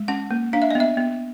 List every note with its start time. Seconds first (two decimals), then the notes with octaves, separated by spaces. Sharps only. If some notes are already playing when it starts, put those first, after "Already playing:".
Already playing: G#3
0.08 C#4 F#5
0.31 A#3
0.53 D4 F5
0.62 E5
0.71 D#5
0.75 B3
0.80 E5
0.97 B3